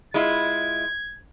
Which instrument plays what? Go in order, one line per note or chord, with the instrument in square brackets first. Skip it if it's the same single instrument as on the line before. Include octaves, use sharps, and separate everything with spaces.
[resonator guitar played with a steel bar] G#3 E4 F4 [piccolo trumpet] G#6